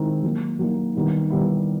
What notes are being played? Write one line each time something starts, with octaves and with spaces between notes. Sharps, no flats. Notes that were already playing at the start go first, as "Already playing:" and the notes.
Already playing: D#3 G#3 C4 E4
F#3 A#3 D#4
F#3 A#3 D#4
D#3 G3 B3 E4
D#3 G3 B3 E4